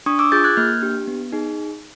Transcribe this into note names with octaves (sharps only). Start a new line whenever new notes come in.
D4 C#6 D#6
D6 E6
F4 G#4 G6 A6
F#6 G#6
A#3 F6 G6
D4 G4
B3
D#4 G#4